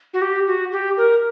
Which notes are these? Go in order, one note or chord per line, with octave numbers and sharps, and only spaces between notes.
F#4
G4
F#4
G4
A#4